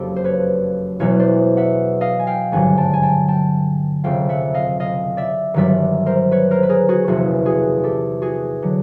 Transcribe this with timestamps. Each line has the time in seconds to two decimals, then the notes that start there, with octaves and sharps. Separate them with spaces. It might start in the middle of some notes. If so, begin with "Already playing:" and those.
Already playing: F#1 F2 F#3 G4 A4
0.16 C5
0.24 B4 C#5
0.99 E1 E2 B2 F#3 B4 C#5
1.19 C5 D5
1.57 E5 F#5
2.01 D#5 F5
2.19 G#5
2.27 F5 G5
2.52 G#1 G2 D3 F#3 F#5 G#5
2.77 G5 A5
2.93 G#5
3.02 G5 A5
3.28 G5 A5
4.04 F1 F2 C#3 F#3 F5 G5
4.29 E5 F#5
4.54 D#5 F5
4.80 D#5 F5
5.17 D5 E5
5.54 G1 G2 D#3 F#3 D5 E5
6.06 A#4 C5
6.32 B4 C#5
6.51 A#4 C5
6.63 B4
6.69 G#4 A#4
6.89 F#4 G#4
7.07 F#1 E2 C3 F3 F#4 G#4
7.45 F#4 G#4
7.84 G4 A4
8.22 F#4 G#4
8.62 D3 F#3